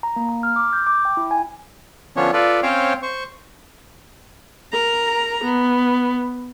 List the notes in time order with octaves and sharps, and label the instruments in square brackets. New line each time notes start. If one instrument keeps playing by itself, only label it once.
[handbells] A#5
A#3
A#5
F6
D6
G6
D6
G5
E4
G#5
[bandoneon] D3 F3 B3 C#4 D4 C#5
F4 A4 B4 D5
C4 C#4 C5 C#5 F5 G5
C5 C#6
[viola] A#4 A#5
B3